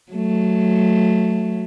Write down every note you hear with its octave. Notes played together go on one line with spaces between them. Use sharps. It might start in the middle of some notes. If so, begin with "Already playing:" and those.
F#3 A3